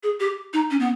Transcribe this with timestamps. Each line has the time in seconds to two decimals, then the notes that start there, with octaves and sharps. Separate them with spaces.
0.03 G#4
0.20 G4
0.53 D#4
0.71 C#4
0.80 B3